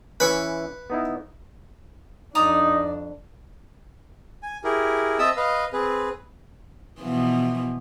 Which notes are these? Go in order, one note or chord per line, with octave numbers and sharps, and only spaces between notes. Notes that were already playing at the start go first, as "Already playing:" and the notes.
E3 C#4 E4 B4 C#6
B3 D#4 E4
F2 D4 D#4 D5 A#5 D#6
G#5
E4 G4 G#4 A#4
C4 D#5 E5 A5 D#6 E6
B4 D#5 F5
C4 G#4 B4
B2 E3 F3